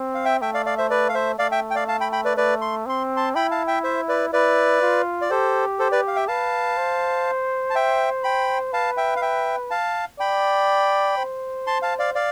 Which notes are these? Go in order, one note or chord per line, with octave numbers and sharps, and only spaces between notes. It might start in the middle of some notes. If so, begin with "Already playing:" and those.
Already playing: C4
F5
E5 G5
A3 E5 G5
D5 F5
D5 F5
C5 E5
B4 D5
F5
C5 E5
A3 D5 F5
E5 G5
G5
D5 F5
F5 A5
G5 B5
G5 B5
B4 D5
A3 B4 D5
C6
C4 C6
A5 C6
E4 G5 B5
F5 A5
E5 G5
C5 E5
B4 D5
E4 B4 D5
F4
D5
G4 A4 C5
A4 C5
B4 D5
F5
E5 G5
B4 F5 A5
C5
A5
E5 G5
G5 B5
B4 F5 A5
E5 G5
F5
E5 G5
F5 A5
D5 G5 B5
C5
A5 C6
F5 A5
D5 F5
D5 F5